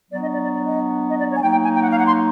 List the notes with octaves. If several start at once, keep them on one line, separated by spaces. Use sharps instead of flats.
F#3 B3 D4 D5
D#5
D5
D5
D5
D#5
D#5
D5
C#5
G#5
F#3 A#3 D#4 G5
G5
G#5
G5
F#5
F5
F#5
C6